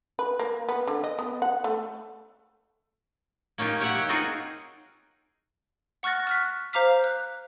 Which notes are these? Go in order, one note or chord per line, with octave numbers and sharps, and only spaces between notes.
B4
A#3
B3
D3
D#5
B3
F#5
A3
A#3 C#4 D#4 F4 G4
C#4 G4 C#5 E5 F#5
G4
C4 D#4 F4 F#4 G#4 A#4
F#5 C#6 F6 F#6 A6 A#6
F6 F#6 B6
C5 F5 A#5 D6 F6 B6
F#6